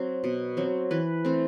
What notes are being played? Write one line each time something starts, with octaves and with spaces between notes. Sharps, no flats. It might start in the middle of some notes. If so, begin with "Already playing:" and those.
Already playing: F#3 C4
B2
F#3 C4
E3 B4
A3 C4